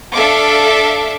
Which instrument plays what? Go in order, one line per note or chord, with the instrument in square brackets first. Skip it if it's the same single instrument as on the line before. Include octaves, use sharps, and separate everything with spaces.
[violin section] D4 A4 E5 F5 D6